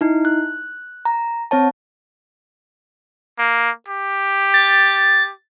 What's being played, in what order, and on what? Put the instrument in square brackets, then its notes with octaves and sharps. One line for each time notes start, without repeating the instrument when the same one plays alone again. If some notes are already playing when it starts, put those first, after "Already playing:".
[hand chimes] D#4 E4
F#6
A#5
C4 C#5 A5
[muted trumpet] A#3
G4
[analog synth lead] A6